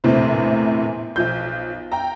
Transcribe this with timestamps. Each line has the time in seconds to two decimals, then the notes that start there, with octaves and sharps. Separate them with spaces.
0.04 A#1 E2 A2 C3 C5
1.16 B1 F3 G6
1.92 G5 A#5